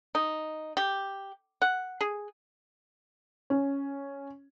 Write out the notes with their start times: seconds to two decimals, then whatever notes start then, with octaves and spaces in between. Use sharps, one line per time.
0.15 D#4
0.77 G4
1.62 F#5
2.01 G#4
3.50 C#4